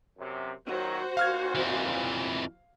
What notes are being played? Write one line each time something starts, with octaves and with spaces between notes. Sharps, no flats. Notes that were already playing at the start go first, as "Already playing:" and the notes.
F#2 C3
A#2 D#3 F#3 F#4 C5
D#2 A#2 F5 F6 G#6
F2 E3